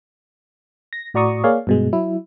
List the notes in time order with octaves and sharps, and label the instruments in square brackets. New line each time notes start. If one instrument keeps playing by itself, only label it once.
[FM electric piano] A#6
A2 F#4 D5 A#5 C#6 D#6
A#3 G#4 C#5 D5 F5
G2 B2 G#3
F#3 E4